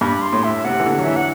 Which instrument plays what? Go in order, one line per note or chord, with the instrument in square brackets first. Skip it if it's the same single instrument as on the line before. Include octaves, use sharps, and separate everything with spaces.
[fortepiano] G2 [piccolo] B5
[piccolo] C6
[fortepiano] A2
[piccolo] E5
[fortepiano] C3 [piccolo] F#5
[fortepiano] E3
D3
F#3
[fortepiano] E3 [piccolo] E5
[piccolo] F#5